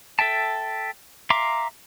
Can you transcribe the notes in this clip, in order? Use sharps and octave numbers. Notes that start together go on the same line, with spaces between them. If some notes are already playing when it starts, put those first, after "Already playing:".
A4 E5 G5 A5
E5 F5 A#5 C6 D6